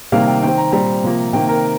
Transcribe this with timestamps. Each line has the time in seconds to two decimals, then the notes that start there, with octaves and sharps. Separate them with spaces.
0.12 C3 D#3 G3 A#3 F5
0.27 G5
0.43 D#3 C4 G5
0.58 A#5
0.72 A#2 G3 C4 A#5
1.03 C3 F3 A#3
1.33 C3 D#3 A#3 G5
1.49 A#4